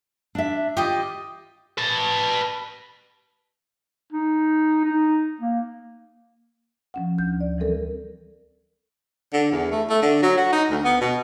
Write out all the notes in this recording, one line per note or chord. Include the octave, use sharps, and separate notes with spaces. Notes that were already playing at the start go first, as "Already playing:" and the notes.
D4 E5
F4 G4 D#5
B4 A5
D#4
D#4
A#3
F3 C#4 F#5
D2 G6
D5
E3 F#3 G3 C4 A4 A#4
D3
E2
A3
A3
D3
F#3
F#4
D#4
D2
B3
B2